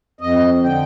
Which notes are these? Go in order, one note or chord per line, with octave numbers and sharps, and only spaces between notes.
F2 D#5
D3 G5